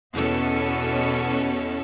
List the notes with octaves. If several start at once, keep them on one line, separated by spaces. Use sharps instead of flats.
E2 B2 C#4 A4